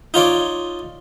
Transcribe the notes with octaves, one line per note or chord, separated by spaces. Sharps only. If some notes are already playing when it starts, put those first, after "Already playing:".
D#4 F4 C#5 D5